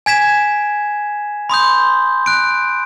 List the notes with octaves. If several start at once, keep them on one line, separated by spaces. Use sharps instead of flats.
G#5 G#6 B6 E7
B5 C6 D#6 G6
F#6 D7